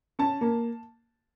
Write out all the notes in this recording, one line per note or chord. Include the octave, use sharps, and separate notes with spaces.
C#4 A5
A#3